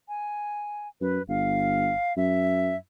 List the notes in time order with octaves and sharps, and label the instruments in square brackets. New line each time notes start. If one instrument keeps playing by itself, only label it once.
[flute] G#5
[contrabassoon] F#2 [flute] B4
[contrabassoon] G1 [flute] F5
[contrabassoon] F#2 [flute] E5